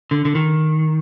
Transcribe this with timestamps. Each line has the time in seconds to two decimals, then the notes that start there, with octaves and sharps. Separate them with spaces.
0.11 D3
0.25 D3
0.35 D#3